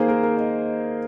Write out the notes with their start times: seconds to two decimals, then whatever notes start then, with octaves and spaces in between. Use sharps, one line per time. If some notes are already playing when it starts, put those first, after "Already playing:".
Already playing: D#3 A#3 G#4 C5
0.08 A#4
0.23 A#4
0.37 D#5